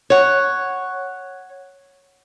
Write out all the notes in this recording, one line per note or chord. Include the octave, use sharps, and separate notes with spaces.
C#5 F#5